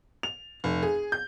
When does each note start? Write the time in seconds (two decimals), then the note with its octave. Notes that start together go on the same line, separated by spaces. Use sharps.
0.23 F7
0.64 F1
0.83 G#4
1.12 G6